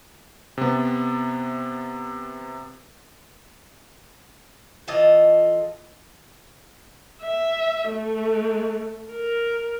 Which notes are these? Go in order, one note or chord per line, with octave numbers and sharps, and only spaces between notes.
C3 B3
E3 F4 A4 D#5
E5
A3
A#4